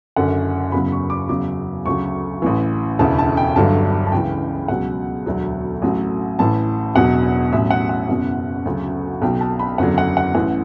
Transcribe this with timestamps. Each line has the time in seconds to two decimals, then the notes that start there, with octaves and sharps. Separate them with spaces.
0.16 F#1 F#2 D3 F#5
0.72 F#1 E2 C#3 F#3 B5
0.92 C#6
1.10 D6
1.29 F#1 E2 C#3 F#3 D6
1.86 D2 C#3 F#3 C#6
2.42 A1 A2 E3
2.99 E1 D2 C#3 E3 A5
3.19 A5
3.37 G5
3.56 G1 G2 D3 F#3 A5
4.07 A5
4.12 C#2 C#3 E3 G5
4.68 C#2 B2 F#3 F#5
5.26 E1 D2 D3 F#3
5.82 A1 A2 F#3
6.39 A1 A2 E3 A5
6.95 E1 E2 B2 F#3 F#5
7.52 A1 A2 F#3 E5
7.71 F#5
7.89 F#5
8.09 F#1 E2 B2
8.65 D2 C#3 F#3
9.22 B1 B2 F#3 G5
9.41 A5
9.59 B5
9.78 F#1 E2 D3 F#3 F#5
9.98 F#5
10.17 F#5
10.35 A1 A2 E3 F#5